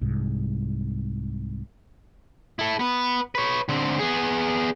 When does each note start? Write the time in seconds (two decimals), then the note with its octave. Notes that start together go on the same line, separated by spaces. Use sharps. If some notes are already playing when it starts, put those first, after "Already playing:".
0.01 C2 G#2
2.59 E4 A4
2.79 B3 B4
3.35 B4 C#5
3.69 D3 C4
3.99 B3 G#4